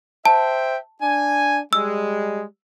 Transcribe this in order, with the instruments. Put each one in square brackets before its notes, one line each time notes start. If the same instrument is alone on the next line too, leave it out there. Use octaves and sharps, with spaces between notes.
[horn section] C5 E5 G5 [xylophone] A5
[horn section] D4 G#5
[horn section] G3 G#3 [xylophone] E6